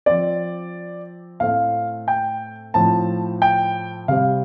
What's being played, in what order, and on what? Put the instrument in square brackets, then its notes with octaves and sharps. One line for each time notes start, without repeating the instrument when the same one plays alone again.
[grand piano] F3 C4 D5
A2 A3 C4 F5
G5
A2 F3 C4 A5
G5
C3 G3 C4 F5